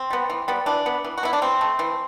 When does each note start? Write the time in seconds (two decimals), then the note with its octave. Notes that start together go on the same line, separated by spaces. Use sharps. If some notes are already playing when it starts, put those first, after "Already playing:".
Already playing: C4
0.10 G3 B3
0.30 E3
0.48 G3 B3
0.66 E3 D4
0.86 B3
1.04 E3
1.18 F#4
1.23 B3 E4
1.33 D4
1.42 E3 C4
1.61 A3
1.79 E3